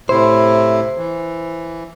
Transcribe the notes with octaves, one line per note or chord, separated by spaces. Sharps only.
A2 C3 E4 C5
E3